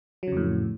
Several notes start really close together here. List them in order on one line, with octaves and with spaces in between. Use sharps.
F#3 C#3 F2 A2